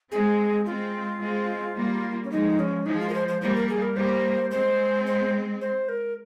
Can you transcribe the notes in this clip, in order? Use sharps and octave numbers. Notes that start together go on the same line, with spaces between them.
G#3 C4 G#4
G#3 C4 F4
G#3 C4
G3 A#3
C#4
F3 G#3 D#4
C#4
F3 G#3 D#4
F4
A#4
C5
C5
G3 A#3 C5
A#4
G#4
A#4
G3 A#3 C5
G#3 C4 C5
C5
C5
A#4